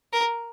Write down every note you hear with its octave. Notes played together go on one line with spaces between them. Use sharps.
A#4